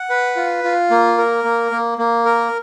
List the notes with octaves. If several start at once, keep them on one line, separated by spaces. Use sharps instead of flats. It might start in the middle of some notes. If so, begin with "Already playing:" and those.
Already playing: F#5
B4
F4
F4
A#3
A#4
A#3
A#3
A#3
A#4